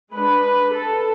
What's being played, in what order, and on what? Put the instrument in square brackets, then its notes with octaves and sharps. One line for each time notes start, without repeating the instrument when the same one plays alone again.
[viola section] G#3 D4 B4
A4